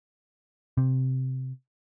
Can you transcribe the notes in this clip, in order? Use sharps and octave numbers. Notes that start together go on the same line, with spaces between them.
C3